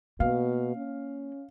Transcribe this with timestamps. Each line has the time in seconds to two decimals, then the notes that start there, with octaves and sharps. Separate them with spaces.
0.20 B2 A#3 F5
0.77 C#4